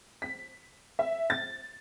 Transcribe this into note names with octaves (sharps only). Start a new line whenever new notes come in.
B6
E5
A6